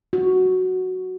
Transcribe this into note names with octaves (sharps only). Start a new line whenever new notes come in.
F#4